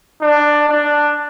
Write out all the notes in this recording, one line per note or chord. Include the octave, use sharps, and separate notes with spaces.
D4
D4